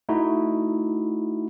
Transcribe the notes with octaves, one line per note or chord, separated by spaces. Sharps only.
A3 D#4 E4 F#4